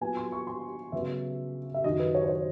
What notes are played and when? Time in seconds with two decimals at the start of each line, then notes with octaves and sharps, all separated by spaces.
0.01 A#2 F#3 B3 G#5
0.17 C6
0.32 C#6
0.47 C6
0.92 C#3 F#3 B3 E5
1.74 E5
1.84 F#2 D#3 F#3 D#5
2.00 B4
2.15 C#5
2.22 C5
2.29 C#5